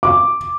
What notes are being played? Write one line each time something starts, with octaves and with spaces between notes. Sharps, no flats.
D6